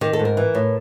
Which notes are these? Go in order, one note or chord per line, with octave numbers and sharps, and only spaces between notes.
D#3 G4
A4
G#2
A#4
E3
A2